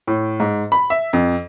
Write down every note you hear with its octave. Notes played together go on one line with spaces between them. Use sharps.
A2
G#2
B5
E5
F2